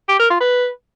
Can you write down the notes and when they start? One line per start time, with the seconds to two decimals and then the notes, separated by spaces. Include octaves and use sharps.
0.09 G4
0.19 A#4
0.30 F4
0.41 B4